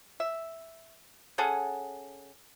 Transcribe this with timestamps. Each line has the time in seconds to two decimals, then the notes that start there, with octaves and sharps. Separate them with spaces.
0.20 E5
1.38 C#4 G#4 A4 F#5